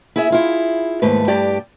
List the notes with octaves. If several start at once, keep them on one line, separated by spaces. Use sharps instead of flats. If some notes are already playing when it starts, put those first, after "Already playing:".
E4 G#4 E5
E4 F4 G#4
D#2 G#2 A3 B4
G2 G4 D5